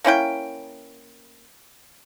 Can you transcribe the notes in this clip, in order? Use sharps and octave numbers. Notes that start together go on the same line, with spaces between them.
A#3 C#4 E4 G5